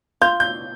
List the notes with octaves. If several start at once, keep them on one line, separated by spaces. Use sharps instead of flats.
F4 G6
G6